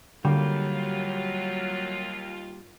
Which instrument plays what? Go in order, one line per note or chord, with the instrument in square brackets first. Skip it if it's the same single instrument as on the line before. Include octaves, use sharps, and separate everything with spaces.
[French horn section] D#2 F4 [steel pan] D3 [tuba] F#3 [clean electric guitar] G3 A#3